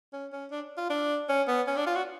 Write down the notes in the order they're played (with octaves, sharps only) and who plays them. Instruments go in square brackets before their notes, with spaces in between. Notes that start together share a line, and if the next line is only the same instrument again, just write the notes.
[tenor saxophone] C#4
C#4
D4
F4
D4
C#4
B3
C#4
D4
F4
F#4